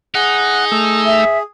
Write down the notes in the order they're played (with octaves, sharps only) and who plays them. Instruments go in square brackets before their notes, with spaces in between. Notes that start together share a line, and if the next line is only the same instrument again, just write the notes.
[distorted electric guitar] D#4 [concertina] G#4 [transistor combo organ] F#5
[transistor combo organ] A3 E6
[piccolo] E5